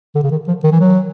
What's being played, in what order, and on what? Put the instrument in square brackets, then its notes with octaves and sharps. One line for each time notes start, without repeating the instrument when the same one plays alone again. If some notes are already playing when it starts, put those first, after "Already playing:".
[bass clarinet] D3
C#3
D#3
F3
D#3
E3
F#3